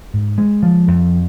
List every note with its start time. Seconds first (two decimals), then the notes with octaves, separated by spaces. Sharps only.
0.14 G#2
0.38 G#3
0.63 F3
0.88 F2